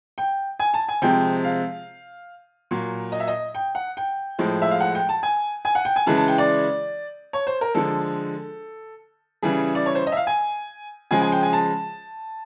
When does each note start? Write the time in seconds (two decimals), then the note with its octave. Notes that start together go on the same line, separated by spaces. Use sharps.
0.18 G5
0.59 G#5
0.74 A5
0.88 G#5
1.02 C3 F3 G#3 G5
1.44 F5
2.71 A#2 F#3
3.12 D#5
3.20 E5
3.28 D#5
3.55 G5
3.75 F#5
3.97 G5
4.39 A2 F3 G#3
4.62 E5
4.71 F5
4.81 F#5
4.95 G5
5.09 A5
5.23 G#5
5.65 G#5
5.75 F#5
5.85 G5
5.96 G#5
6.06 C#3 E3 G#3 A5
6.17 A5
6.28 G5
6.38 D5
7.33 C#5
7.47 C5
7.61 A#4
7.75 D3 F3 G#3 A4
9.42 C#3 E3 G3 G#4
9.75 D5
9.86 C#5
9.95 C5
10.06 D#5
10.12 E5
10.17 F5
10.27 G#5
11.11 C#3 F3 G#3 G#5
11.22 G#5
11.32 G5
11.43 G#5
11.53 A5